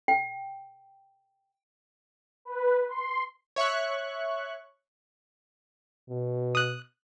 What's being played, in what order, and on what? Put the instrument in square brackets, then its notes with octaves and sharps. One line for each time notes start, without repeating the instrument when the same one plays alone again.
[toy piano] G5
[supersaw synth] B4
C6
[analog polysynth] C#5 E5 C#6 F#6
[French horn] B2
[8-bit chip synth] D#6 F#6